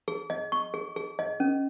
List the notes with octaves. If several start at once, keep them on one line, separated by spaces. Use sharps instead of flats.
G#4
D#5
C#6
G#4
G#4
D#5
C#4